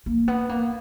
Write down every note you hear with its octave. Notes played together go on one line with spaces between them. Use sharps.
A#3
B3
A#3